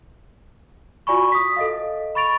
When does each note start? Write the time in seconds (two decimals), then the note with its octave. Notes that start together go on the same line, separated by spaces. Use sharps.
1.07 F4 F#4 D5 G#5 B5 C#6
1.32 D#6 B6
1.56 A4 D#5 F5
2.15 B5 C#6 A6 D7 F7